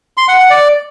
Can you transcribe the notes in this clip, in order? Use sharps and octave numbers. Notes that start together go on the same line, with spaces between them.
C6
F#5
F#5
D5